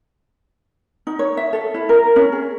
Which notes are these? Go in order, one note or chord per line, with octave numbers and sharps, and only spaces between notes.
D#4
C#5
E5
A4
E4
A#4
C#4
G#4